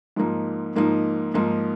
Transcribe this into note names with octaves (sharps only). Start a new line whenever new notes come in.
G#2 F3 A#3 D#4
G#2 F3 A#3 D#4
G#2 F3 A#3 D#4